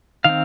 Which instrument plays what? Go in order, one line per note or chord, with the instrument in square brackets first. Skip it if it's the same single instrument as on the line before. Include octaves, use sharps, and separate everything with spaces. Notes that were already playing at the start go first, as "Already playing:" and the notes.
[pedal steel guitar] D#3 C4 F5